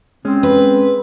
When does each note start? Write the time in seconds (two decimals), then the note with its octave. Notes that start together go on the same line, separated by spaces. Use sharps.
0.25 G#3 C4 C#4
0.43 B4